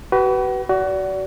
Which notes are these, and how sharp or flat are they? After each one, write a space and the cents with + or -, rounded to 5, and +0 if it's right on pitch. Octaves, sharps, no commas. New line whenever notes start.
F#4 +40 B4 +0
F#4 +20 D5 -30